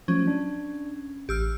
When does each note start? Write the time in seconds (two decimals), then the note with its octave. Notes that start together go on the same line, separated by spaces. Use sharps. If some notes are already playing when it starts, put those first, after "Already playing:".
0.08 F3 F#3 A3 C#4
0.27 D4
1.29 A1 G4 E6 F6